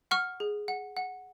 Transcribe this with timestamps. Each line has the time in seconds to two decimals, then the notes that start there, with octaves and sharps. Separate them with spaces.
0.11 F#5 C#6 F6
0.40 G#4
0.68 F#5
0.97 F#5